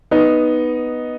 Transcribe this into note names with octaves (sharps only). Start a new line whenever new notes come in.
B3 D#4